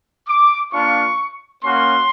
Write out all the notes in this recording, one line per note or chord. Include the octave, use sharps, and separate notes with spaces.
D6
A#3 D4 F4 C#6
A#3 C#4 F#4 C6